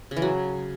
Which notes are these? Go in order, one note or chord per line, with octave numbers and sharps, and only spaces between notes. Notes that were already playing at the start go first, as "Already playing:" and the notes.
C#3
E3
F#3